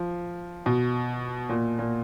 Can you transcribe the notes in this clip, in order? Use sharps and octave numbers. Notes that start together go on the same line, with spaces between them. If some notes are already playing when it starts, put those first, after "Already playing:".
Already playing: F3
B2
A#2
A#2